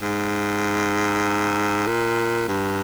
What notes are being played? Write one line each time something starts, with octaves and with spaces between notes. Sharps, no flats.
G#2
A#2
G2